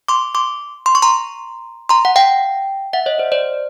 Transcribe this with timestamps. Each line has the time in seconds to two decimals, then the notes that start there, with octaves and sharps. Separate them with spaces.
0.08 C6 D6
0.35 C6 D6
0.86 C6
0.95 C#6
1.02 A#5 C6
1.89 A#5 C6
2.05 F#5
2.16 F5 G5
2.93 E5 F#5
3.06 C#5 D#5
3.18 C5 D5
3.32 C5 D5